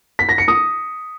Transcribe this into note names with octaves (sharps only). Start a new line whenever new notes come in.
B6
A#6
C#7
D#6